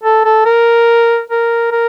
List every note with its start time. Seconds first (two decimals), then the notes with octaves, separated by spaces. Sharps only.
0.04 A4
0.25 A4
0.46 A#4
1.30 A#4
1.72 A#4